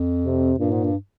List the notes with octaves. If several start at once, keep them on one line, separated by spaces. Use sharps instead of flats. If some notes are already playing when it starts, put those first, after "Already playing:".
Already playing: F2
C3
G2 A#2
G#2
G2